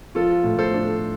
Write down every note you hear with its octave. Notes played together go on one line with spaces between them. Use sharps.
F3 F4 A4
A2
A4 C5
D4